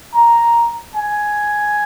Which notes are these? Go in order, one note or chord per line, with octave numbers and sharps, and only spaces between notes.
A#5
G#5